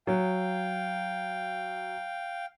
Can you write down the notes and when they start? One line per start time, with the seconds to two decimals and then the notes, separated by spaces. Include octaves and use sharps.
0.07 F#3 F5 G5